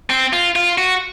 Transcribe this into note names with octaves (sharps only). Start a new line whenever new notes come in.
C4
F4
F4
F#4